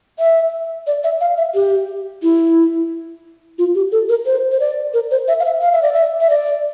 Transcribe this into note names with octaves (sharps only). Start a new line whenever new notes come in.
E5
D5
E5
F5
E5
G4
E4
F4
G4
A4
A#4
C5
C5
D5
A#4
C5
E5
F5
E5
F5
E5
D5
E5
E5
D5